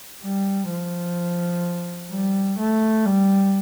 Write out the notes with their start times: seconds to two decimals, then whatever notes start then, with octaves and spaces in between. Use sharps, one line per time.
0.23 G3
0.70 F3
2.11 G3
2.59 A3
3.06 G3